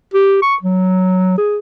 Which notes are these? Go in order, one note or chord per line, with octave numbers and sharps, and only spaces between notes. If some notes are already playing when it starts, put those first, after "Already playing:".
G4
C#6
F#3
G#4